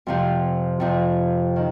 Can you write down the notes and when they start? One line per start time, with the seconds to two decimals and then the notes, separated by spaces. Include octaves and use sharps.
0.07 F2 C3 F3
0.80 F2 C3 F3
1.56 D#3